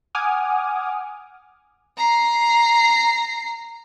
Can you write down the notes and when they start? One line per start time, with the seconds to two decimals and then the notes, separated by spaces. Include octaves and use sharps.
0.15 F#5 G#5 D6 D#6 F6
1.97 A#5 C7